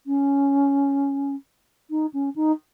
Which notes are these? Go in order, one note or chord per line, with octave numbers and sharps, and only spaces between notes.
C#4
D#4
C#4
D#4